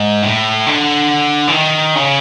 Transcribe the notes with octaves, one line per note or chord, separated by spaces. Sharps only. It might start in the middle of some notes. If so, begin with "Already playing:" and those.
Already playing: G#2
A2
D3
E3
D#3
C#3